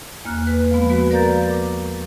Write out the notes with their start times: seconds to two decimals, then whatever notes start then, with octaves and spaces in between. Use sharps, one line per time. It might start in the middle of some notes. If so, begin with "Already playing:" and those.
0.25 E2 A#3 F6 F#6
0.47 B4
0.71 F3 G#3 B3
0.90 B3 F#4 B4
1.11 A#4 D5 F5 A#5 G6 A6
1.50 D6